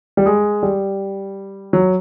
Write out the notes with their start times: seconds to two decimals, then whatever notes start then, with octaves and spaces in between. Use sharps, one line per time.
0.17 G3
0.26 G#3
0.63 G3
1.73 F#3